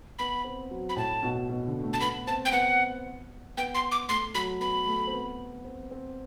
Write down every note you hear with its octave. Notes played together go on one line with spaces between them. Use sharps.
B3 B5
C4
F#3
B5
A2 A5
B2
B2
D3
A3
A5
B3 B5
C4 A5
G5
B3 F#5
B3 G5
C6
D6
A3 C6
F#3 B5
B3 B5
A3
C4
B3
C4
C4